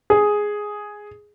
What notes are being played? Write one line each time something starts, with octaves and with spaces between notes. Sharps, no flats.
G#4